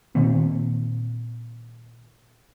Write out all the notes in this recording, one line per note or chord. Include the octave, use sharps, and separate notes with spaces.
A#2 D#3 A#3 C4